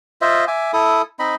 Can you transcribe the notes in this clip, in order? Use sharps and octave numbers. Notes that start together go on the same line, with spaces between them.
F4 C5 D#5 E5
E5 G#5 D6
E4 A4 D#6
C4 D#4 D#5 B5